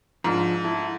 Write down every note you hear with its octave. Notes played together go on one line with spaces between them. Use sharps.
G#2 F3 D4
E4 A4